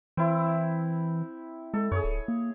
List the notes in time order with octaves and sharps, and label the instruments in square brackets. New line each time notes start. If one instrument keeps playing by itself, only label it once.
[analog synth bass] E3 [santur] C4 E4
[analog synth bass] G#3 [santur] A4
[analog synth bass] F#2 [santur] G#4 C#5
[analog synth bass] D1
A#3